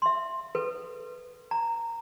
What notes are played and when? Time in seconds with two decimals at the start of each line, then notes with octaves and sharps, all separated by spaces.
0.02 E5 C6
0.55 A4 B4
1.51 A#5